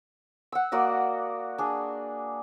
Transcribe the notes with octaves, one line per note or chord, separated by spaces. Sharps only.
F#5 E6
A#3 F#4 D5 D#5
D4 G#4